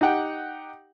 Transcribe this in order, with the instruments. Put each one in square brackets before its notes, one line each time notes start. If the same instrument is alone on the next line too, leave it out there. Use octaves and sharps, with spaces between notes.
[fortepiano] D#4 G4 F#5 G5